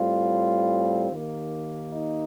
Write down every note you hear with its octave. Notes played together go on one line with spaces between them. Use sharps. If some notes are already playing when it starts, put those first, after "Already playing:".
Already playing: A2 G3 C4 F4
D#2 D#3 A#3
D#4